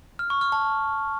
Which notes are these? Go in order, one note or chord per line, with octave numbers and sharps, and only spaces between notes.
F6
C#6
F6
A5